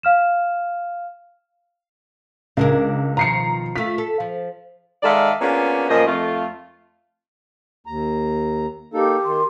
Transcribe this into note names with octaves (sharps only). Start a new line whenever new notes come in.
F5 F6 E7
C#2 D4 G#4 A#4
B2 D#3 F3 A#5 C7 C#7
A3 F4 B6
A4
F3
D#3 G#3 A4 D5 E5 F5
A#3 B3 C#4 D4 F4 G#4
F#2 A#2 F3 A#3 D#5
F2 A3 F4
D#2 A#5
A#3 D#4 G4 A4
D#3 C6